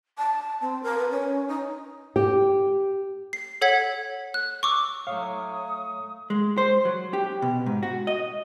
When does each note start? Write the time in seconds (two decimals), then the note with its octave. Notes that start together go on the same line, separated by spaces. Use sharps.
0.18 A5
0.61 C4
0.83 A#4
0.98 B4
1.10 C#4
1.48 D#4
2.16 G4
3.33 C7
3.61 A4 C#5 F#5 G#6 B6
4.34 F#6
4.63 C#6 D6 E6
5.07 F#3 A3 C#5 F5 D#6
6.30 G#3
6.58 C5
6.85 F#3
7.13 G4
7.42 B2
7.66 G#2
7.83 F#4
8.07 D#5